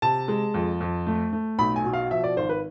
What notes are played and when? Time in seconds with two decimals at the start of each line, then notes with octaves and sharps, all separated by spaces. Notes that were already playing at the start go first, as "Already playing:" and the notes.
0.02 C3 A5
0.28 G#3
0.54 F2
0.81 F2
1.07 A3
1.33 A3
1.58 B1 B5
1.76 G#5
1.84 B2
1.93 F5
2.11 F3 E5
2.24 D5
2.37 G#1 C5
2.49 B4